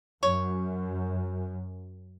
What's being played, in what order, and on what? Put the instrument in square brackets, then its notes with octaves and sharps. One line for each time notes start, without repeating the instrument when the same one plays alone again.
[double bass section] F#2 [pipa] C#5